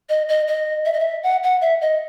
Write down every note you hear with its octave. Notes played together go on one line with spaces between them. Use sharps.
D#5
D#5
D#5
E5
D#5
E5
F#5
F#5
E5
D#5